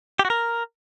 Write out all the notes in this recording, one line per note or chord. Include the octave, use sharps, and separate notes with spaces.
G4
F#4
A#4